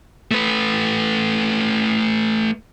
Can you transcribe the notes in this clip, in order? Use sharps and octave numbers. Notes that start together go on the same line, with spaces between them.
A3 B4